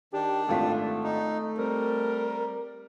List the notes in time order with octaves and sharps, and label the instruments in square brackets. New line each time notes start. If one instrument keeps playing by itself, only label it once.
[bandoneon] D#3 D4 [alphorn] G4
[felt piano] G#1 F4 B6 [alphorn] A3
[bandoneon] D#4
[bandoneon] G3 [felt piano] C4 [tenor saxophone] A#4